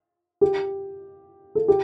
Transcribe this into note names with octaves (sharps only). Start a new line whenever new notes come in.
G4
A4
G4